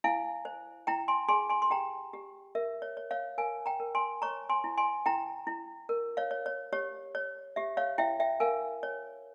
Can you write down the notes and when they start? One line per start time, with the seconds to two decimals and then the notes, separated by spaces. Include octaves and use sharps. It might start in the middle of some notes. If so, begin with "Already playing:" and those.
0.04 E4 F5 G#5
0.45 C5
0.87 E4 G5 A#5
1.08 G#5 C6
1.28 G#4 G#5 C6
1.49 G#5 C6
1.62 C6
1.70 G4 G5 A#5
2.13 G4
2.55 A#4 E5
2.82 C#5
2.97 C#5
3.11 C#5 F5
3.38 A#4 F5 G#5
3.66 G5 A#5
3.80 A#4
3.95 G#5 C6
4.22 C#5 A#5 C#6
4.49 G#5 C6
4.64 E4
4.77 G#5 C6
5.06 E4 G5 A#5
5.47 E4
5.89 A#4
6.17 C#5 F5
6.31 C#5
6.46 C#5
6.73 G4 C#5
7.15 C#5
7.56 G4 E5
7.77 C#5 F5
7.98 E4 E5 G5
8.20 E5 G5
8.40 A#4 F5 G#5
8.83 C#5